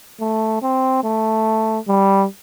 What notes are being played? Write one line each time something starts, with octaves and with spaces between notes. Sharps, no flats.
A3
C4
A3
G3